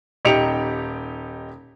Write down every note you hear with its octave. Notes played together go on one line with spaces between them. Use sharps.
D#1 D#4 G4 C#7 D7 F7